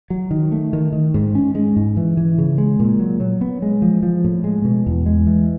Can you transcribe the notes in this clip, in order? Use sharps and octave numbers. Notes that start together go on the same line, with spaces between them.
F#3
D#3
A3
D#3
D#3
G#2
C#4
G#3
G#2
E3
E3
C#3
G#3
A#2
F#3
F#3
B3
G#3
F3
F3
A2
G#3
B2
E2
G#3
E3